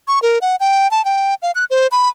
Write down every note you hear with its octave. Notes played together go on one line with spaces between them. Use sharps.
C#6
A#4
F#5
G5
A5
G5
F5
F#6
C5
B5